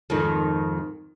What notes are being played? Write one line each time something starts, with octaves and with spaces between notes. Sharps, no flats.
F2 G#2 D#3